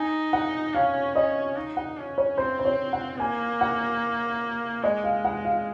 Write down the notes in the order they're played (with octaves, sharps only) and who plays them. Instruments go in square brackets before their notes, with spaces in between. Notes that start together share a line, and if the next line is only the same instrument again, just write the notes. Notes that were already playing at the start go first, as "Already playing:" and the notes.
Already playing: [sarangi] D#4 [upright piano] G#5
[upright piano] F#5
[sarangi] C#4 [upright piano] F5
[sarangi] C#4 [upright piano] D#5
[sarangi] D#4
[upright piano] F#5
[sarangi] C#4
[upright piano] C#5
[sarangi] C4 [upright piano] C5
[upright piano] C5
C#5
F#5
[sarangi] A#3 [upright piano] G#5
[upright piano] F#5
[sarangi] G#3 [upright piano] D#5
[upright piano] F5
F#5
F5